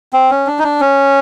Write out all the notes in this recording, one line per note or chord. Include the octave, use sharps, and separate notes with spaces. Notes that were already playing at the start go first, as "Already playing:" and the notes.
C4
C#4
D4
D#4
D4
C#4